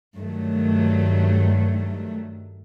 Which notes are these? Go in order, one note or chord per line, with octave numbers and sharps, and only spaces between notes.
G2 D#3 F#3 A3